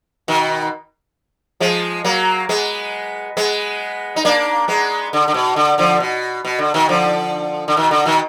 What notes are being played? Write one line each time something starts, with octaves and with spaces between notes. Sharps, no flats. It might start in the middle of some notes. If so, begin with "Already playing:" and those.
B2 D#3
F3 G#3
F#3 A#3
G#3 B3
G#3 B3
D#4
A#3 D4
G#3 B3
D3
D3
B2
D3
D3 F3
B2
B2
D3
B2 D#3
D3 F3
D3
B2 D#3
D3
B2 D#3